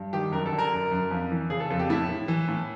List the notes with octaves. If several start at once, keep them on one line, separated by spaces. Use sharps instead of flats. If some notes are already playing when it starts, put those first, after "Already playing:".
Already playing: G2
D#3 G4
F#2 A#4
A4
D3
A#4
F#2
F#2
F2
E3
C#3 G#4
A4
F2 A4
G4
A2 E4
A2
E3
A2